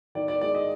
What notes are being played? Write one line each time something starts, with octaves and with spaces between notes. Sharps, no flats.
D#3 D5
D5
G#3 D5
D#5